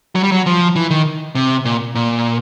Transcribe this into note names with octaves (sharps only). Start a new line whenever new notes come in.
F#3
G3
F#3
F3
E3
D#3
C3
A#2
A#2